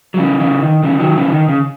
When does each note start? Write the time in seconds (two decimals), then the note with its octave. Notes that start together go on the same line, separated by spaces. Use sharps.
0.14 F#3
0.18 C#3 E3
0.40 C#3 E3
0.62 D#3
0.83 C#3 E3
0.99 D#3 F#3
1.17 C#3 E3
1.32 D#3
1.48 C#3